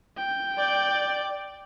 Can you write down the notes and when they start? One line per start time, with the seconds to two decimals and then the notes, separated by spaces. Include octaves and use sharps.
0.17 G5
0.58 D5